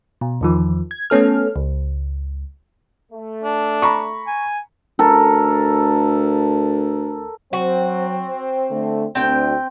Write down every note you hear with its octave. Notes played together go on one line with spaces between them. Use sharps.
B2
E2 D#3 F3
G#6
A3 B3 C#4 A4 F6
C#2
A3
D4
A#5 B5 C#6
G#5
D2 A4 A#4
F#3 C4 F#4
D3 A3
D2 C4 G5